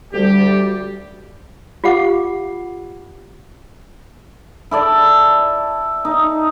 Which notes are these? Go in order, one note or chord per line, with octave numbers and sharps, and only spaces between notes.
D2 G3 G4
F4 G4 F5 F#5 D6
E4 A4 D5
D#4